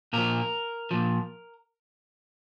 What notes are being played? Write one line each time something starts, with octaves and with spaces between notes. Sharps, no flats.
A#2 F3 A#4
A#2 F3